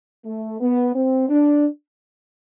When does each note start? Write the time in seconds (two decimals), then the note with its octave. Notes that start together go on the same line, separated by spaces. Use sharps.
0.25 A3
0.60 B3
0.94 C4
1.29 D4